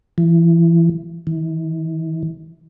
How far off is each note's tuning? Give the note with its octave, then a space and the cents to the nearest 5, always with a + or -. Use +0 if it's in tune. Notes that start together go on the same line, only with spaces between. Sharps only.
E3 +25
E3 -40